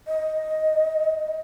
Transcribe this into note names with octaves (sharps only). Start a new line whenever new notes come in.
D#5